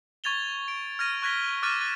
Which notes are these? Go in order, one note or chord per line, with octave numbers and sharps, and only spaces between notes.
C#6 G#6 A6 F7 G7
D7
F6 G#6 A#6 D#7
C#6 F#6 G#6 A#6 B6 G7
D6 F6 F#6 A6 D#7
F#6 A6 D#7